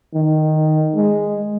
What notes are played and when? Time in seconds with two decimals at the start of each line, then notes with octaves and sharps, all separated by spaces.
0.14 D#3
0.96 G#3